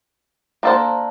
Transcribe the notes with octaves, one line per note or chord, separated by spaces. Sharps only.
A#3 D4 A4 C5